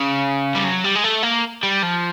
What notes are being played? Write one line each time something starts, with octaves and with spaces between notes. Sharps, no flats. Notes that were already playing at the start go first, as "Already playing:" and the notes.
Already playing: C#3
G3
F#3
G3
G#3
A3
A#3
G3
F3